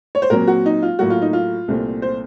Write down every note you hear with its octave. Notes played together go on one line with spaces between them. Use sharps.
C#5
C5
A#2 F#3 C4 A#4
F#4
D#4
F4
A2 F#3 A#3 F#4
F4
D#4
F4
C2 A#2 A3 C4
C5